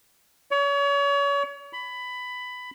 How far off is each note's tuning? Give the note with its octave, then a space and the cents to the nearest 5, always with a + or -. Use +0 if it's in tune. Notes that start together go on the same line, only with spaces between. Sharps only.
C#5 +35
B5 +15